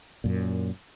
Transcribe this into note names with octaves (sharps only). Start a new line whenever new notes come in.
F#2 A#2